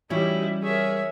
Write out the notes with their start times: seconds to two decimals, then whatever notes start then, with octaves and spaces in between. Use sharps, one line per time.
0.10 E3 G3 C#4 D#4 E4 F#4 G4
0.63 G#4 A#4 C#5 E5